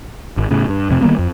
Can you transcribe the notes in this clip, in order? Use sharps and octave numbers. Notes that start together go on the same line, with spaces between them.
G#1
A2 C#3
G2
F2 C3
D#3 G3 A#3 B3
F2